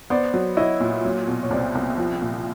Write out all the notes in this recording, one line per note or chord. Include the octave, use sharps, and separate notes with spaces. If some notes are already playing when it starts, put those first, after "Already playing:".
B3 C5 D5
F#3
E4 C#5 D#5
A#2
F#3
B2
C#5
C2 C5 D5
C2
F3
A#2